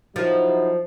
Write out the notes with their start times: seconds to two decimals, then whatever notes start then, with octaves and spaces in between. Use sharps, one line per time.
0.16 F3 F#3 D#4 E4